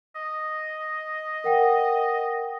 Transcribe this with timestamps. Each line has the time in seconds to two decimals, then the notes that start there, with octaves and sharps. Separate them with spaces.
0.15 D#5
1.44 A#4 F#5 G5